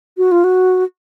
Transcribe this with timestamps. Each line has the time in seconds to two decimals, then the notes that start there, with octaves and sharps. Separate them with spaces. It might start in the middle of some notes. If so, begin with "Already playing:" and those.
0.18 F#4
0.32 F4
0.44 F#4